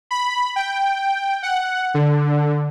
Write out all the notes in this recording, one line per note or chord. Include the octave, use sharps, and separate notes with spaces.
B5
G5
F#5
D3